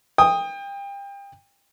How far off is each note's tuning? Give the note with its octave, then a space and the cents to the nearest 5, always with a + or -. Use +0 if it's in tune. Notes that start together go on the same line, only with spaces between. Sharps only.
G5 +30 D#6 +0